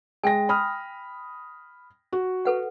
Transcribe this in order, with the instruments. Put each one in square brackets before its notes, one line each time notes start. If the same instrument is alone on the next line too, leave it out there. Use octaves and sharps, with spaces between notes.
[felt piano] G#3 A#6 [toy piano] G5 G#5
[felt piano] B5 D#6 F6
F#4
[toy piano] A4 B4 F#5